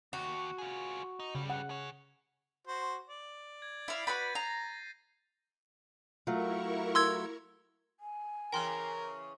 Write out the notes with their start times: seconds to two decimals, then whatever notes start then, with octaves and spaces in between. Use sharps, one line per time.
0.13 D#2 F#4
0.58 F4 G#4
1.20 D#4
1.35 G2 C#3 G3
1.50 F#5
1.70 G#4 C#5
2.67 F#4 C5
3.07 D5
3.62 G#6
3.88 E4 F5
4.07 F#4 B4 B5 G6 A6 D#7
4.35 A#5 A#6 C7
6.27 F#3 A3 E4 F4 A#4 C#6
6.95 C6 E6 G#6
8.00 G#5
8.52 C#3 E3 C#4 A#4 G5 C6 F6